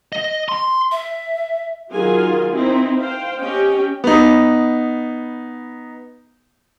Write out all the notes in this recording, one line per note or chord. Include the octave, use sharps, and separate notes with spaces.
D#5
C6
E5
D#3 F#3 F4 G#4 G#5
C4 D#4 E4 C5
C5 F5 G5
C#4 G4 D#5 G5
B3 D#4